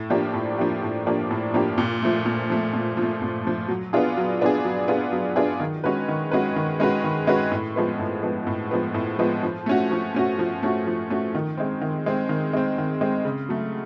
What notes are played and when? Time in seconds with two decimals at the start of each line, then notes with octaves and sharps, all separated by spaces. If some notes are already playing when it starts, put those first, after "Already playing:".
Already playing: A2
0.10 F3 A#3 D4 G4
0.34 A2
0.58 F3 A#3 D4 G4
0.82 A2
1.06 F3 A#3 D4 G4
1.31 A2
1.54 F3 A#3 D4 G4
1.78 A#2
2.02 F3 A3
2.26 A#2
2.50 F3 A3
2.73 A#2
2.97 F3
3.02 A3
3.22 A#2
3.45 F3 A3
3.68 F#3
3.93 B3 D4 F4 G#4
4.18 F#3
4.41 B3 D4 F4 G#4
4.65 F#3
4.88 B3 D4 F4 G#4
5.13 F#3
5.36 B3 D4 F4 G#4
5.60 D#3
5.84 G#3 C#4 F#4 B4
6.08 D#3
6.31 G#3 C#4 F#4 B4
6.56 D#3
6.80 G#3 C#4 F#4 B4
7.04 D#3
7.27 G#3 C#4 F#4 B4
7.52 A2
7.76 F3 G#3 B3
8.00 A2
8.23 F3 G#3 B3
8.47 A2
8.71 F3 G#3 B3
8.94 A2
9.19 F3 G#3 B3
9.43 F3
9.66 A3 C#4 F#4
9.91 F3
10.14 A3 C#4 F#4
10.39 F3
10.63 A3 C#4 F#4
10.87 F3
11.10 A3 C#4 F#4
11.35 D#3
11.57 G#3 C4
11.81 D#3
12.06 G#3 C4
12.29 D#3
12.53 G#3 C4
12.78 D#3
13.01 G#3 C4
13.25 C#3
13.49 F#3 A3